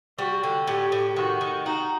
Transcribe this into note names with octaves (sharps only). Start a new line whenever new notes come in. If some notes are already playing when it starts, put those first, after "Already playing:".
G3 F#4
D3
A2 G4
A2
D#3 F#4
D#3
D#4 F#4